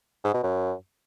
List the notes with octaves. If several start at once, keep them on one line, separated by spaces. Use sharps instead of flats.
G#2
B2
F#2